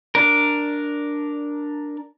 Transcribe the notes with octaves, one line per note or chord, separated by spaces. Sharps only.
D4 A#4